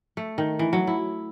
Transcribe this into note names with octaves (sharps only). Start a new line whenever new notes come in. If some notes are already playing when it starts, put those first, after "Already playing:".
A3
D#3
E3
F#3
E4